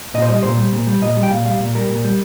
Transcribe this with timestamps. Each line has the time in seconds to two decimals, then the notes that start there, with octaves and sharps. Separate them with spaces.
0.14 A#2 D#5
0.22 C5
0.29 G3 D#5
0.43 A#2 C5
0.58 G3
0.72 A#2
0.87 G3
1.02 A#2 D#5
1.17 G3
1.23 G5
1.31 A#2 F5
1.45 G3 F5
1.60 A#2
1.75 G3 A#4
1.89 A#2
2.04 G3